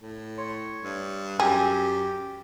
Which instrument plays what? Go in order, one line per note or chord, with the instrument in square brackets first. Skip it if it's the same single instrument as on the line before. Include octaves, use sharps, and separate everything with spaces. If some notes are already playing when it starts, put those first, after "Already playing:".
[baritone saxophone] A2
[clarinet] C#5 [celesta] C6
[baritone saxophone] G2
[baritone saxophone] F#2 [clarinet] G4 [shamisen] G#4 [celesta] G5